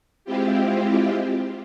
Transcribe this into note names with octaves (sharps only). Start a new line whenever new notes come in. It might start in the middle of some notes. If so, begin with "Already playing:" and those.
G#3 C4 E4 F4 G4